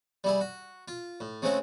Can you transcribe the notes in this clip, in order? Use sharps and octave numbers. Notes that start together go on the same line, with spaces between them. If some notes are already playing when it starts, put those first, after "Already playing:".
G3 E4 G#4
F#4
F4
A2
C#3 G#3 A3 C4 C#4 F#4